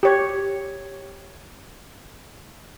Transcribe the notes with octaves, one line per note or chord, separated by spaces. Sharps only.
G4 C#5